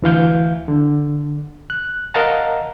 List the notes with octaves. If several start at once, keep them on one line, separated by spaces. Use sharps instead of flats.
D2 E3 F5 G6
D3
F#6
A#4 D#5 F5 F#5 A5 A#5